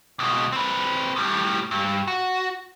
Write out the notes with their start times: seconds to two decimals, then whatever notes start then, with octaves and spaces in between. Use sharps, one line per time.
0.19 C#2 B2
0.52 C4 B4
1.16 A2 G3
1.71 G2
2.08 F#4